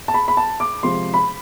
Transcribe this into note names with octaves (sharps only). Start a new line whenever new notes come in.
A5
B5
B5
A5
D6
C3 F3 G#3 C6
B5